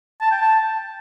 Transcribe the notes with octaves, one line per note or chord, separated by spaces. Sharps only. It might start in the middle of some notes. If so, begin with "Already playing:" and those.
A5
G5
A5